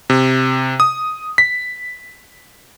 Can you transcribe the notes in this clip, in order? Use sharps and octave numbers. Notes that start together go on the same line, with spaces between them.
C3
D#6
B6